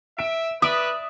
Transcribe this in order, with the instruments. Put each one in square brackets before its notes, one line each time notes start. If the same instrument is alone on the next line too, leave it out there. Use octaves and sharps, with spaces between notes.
[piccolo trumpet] E5 [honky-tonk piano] D7
[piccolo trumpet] B4 [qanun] D5 E5 [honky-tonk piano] D#6